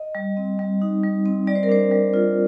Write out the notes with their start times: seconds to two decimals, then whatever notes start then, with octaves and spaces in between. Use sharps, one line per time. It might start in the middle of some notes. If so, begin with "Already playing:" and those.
Already playing: D#5
0.15 G3
0.37 C4
0.59 G3
0.82 D#4
1.03 G3
1.26 C4
1.47 G3 D5
1.55 C5
1.63 A#4
1.69 D4 C5
1.91 G3
2.14 F4